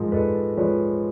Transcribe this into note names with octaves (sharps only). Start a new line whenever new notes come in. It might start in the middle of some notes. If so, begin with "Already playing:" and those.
Already playing: G#2 F3 G#3 A#4
G#2 A4 B4
F3 G#3 B4 C#5